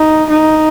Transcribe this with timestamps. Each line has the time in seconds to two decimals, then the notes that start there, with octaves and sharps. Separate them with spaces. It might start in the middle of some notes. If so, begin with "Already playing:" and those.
Already playing: D#4
0.30 D#4